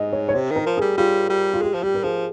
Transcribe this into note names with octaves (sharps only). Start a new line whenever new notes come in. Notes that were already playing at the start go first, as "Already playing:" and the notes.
Already playing: G#2 D#5
C#5
C#5
C3 C5
D#3
A#4
F3
G#4
G3
G3 F4
G3
F4
G#3 G4
F3
G3 G4
A#4
F3 G#4